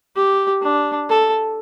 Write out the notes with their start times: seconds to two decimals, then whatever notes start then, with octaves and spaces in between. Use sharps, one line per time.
0.16 G4
0.62 D4
1.10 A4